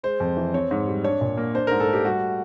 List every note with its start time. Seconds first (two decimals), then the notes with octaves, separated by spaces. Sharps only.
0.03 G#3 C5
0.20 F2
0.37 E3
0.54 C4 C#5
0.71 G#2
0.88 G3
1.04 D4 C#5
1.21 A#2
1.37 A#3
1.54 D4 C5
1.67 A#4
1.71 G#2
1.80 A4
1.88 A3 G4
2.04 G3 F#4